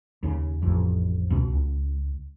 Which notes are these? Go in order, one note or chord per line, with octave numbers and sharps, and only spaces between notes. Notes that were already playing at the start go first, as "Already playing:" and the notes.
D#2 C#3
A1 F2
C#2 B2 C#4
C#2